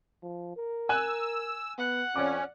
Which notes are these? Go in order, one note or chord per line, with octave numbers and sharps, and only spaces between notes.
F3
A#4
G#5 E6 F#6
B3 F#5
F2 C#4 D5 D6